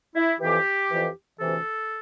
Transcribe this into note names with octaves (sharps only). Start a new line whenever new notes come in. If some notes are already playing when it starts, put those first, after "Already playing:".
E4
F2 E3 G4
F2 E3
D2 C3 E3 A4